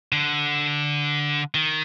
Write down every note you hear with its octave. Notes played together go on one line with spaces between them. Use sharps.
D3
D#3